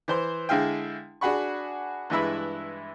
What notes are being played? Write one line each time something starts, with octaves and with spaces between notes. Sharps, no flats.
E3 C5 C6
D3 G#3 E4 G#4 F5 G5
D4 F#4 G#4 F#5 B5 C#6
G2 E3 G#3 E4 E5 B5